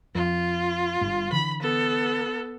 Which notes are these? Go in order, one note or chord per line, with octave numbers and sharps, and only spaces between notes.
F2 F4
G1 G2
D3 E3 B5
B3 A4